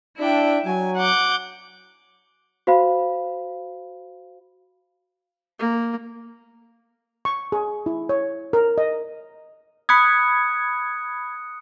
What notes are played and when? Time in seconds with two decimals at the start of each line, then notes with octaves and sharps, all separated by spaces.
0.18 D4 E4 E5 G5
0.65 F#3 G#5
0.98 F#5 D6 G6
2.67 F#4 C5 F5 B5
5.59 A#3
7.25 C#6
7.52 G#4
7.86 E4
8.09 C#5
8.53 A#4
8.78 D#5
9.89 B5 D#6 F#6 G#6 C#7